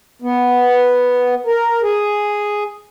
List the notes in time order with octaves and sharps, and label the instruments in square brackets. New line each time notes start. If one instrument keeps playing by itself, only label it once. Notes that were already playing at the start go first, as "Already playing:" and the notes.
[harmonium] B3
A#4
G#4